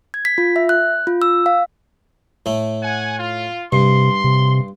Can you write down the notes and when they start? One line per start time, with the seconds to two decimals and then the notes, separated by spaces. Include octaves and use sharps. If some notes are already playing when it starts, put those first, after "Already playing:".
0.14 G#6
0.25 B6
0.38 F4
0.56 E5
0.69 F#6
1.07 F4
1.22 E6
1.46 F5
2.46 A2 A3
2.83 F#5 G#5
3.19 F4
3.72 G2 C3 C6
4.24 C3